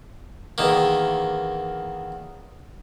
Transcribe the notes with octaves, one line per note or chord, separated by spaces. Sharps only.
E2 D#3 A#3